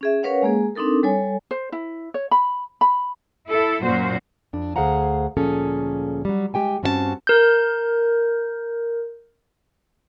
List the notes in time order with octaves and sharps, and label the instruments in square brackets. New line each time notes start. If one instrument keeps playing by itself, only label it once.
[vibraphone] C#4 G#4 E5
C#4 A#4 B4 C#5 F5 F#5
G#3 A#3 G#4
C4 D4 D#4 A4 A#4
G3 A4 C#5 G#5
[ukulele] C5
E4
C#5
B5
B5
[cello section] E4 A4
F#2 A#2 F#4 C5
[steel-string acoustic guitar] F2 D4
D2 G#4 C5 F5 F#5 A#5
D2 A#2 F3 C#4 G#4 A4
F#3 G3
G#3 G4 G5 G#5
G2 C4 C#4 F#4 C#5 A5
[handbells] A#4 G6